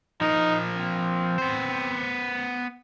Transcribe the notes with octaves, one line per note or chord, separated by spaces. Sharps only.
F3 D#4 A#4
C4
B3 C5